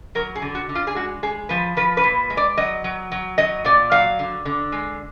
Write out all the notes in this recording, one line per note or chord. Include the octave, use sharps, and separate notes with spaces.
F#3 A#4
G#4
D3
F#4
D3
F4
G#4
G#3 F#4
G#3 G#4
F3 B4
F3 B4
B4
A#2
G#3
D5
F#3 D#5
F#3
F#3
F#3 D#5
A#2 D5
F#3 F5
D3
D3
G#3